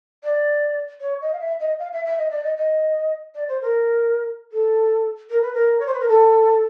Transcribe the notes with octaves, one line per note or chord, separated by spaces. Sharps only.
D5
C#5
D#5
F5
E5
D#5
F5
E5
E5
D#5
D5
D#5
D#5
D5
C5
A#4
A4
A#4
B4
A#4
C#5
C5
B4
A#4
A4